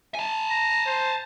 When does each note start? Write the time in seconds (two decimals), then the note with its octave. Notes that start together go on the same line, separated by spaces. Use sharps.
0.15 G#5 A5
0.50 A#5
0.86 C5